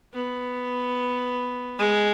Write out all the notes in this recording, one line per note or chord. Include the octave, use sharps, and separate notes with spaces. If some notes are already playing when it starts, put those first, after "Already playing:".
B3
G#3